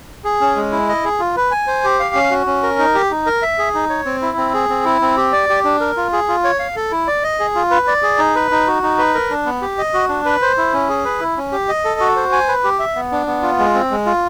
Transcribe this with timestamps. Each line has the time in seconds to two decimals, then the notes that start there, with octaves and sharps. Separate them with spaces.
0.24 G#4
0.41 C#4
0.56 G#3
0.72 E4
0.89 D#5
1.05 G#4
1.20 F4
1.36 B4
1.51 G#5
1.67 C5
1.84 G4
2.00 F5
2.15 C#4
2.31 F#4
2.47 C#4
2.63 A#4
2.79 D#4
2.94 G4
3.11 D#4
3.26 A#4
3.42 E5
3.58 G#4
3.74 D#4
3.90 C#5
4.06 C4
4.22 E4
4.37 C4
4.54 G#4
4.69 C4
4.85 E4
5.02 C4
5.17 G4
5.32 D5
5.49 G4
5.64 D4
5.80 A#4
5.97 F4
6.13 G#4
6.28 F4
6.44 C#5
6.59 F5
6.76 A4
6.92 E4
7.07 D5
7.24 D#5
7.40 G#4
7.55 F4
7.71 B4
7.87 D5
8.02 G#4
8.18 D#4
8.35 B4
8.51 D#4
8.67 F#4
8.83 D#4
8.98 B4
9.14 A#4
9.30 D4
9.46 B3
9.62 G4
9.78 D#5
9.94 F#4
10.09 D4
10.25 B4
10.42 C5
10.57 E4
10.73 C#4
10.89 G#4
11.05 B4
11.20 E4
11.37 C#4
11.52 G4
11.69 D#5
11.85 A4
12.00 F#4
12.16 C5
12.32 G#5
12.48 B4
12.64 G4
12.79 E5
12.95 B3
13.12 D4
13.27 B3
13.43 F4
13.59 G#3
13.74 C4
13.91 G#3
14.06 F4